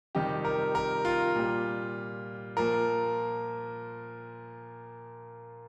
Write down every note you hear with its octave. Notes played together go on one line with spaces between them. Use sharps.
F2 C3 D#3 G3 G4
A#4
A#4
F4
A#2 G3
A#2 F3 A#4